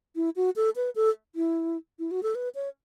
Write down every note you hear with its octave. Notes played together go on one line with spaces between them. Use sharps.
E4
F#4
A4
B4
A4
E4
E4
F#4
A4
B4
C#5